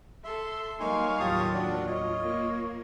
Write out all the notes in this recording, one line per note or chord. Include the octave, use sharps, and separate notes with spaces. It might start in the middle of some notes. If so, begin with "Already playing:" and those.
A4 E5 C6
F#3 G3 A#3 D#4 C#5 F5 G#5 C6
D#2 A2 F#3 F4 G4 A5 D#6
D4 F4 F#4 D5
C#5 D#5
A#3